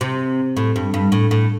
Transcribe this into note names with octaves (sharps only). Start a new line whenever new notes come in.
C3
A2
G2
G2
A2
A2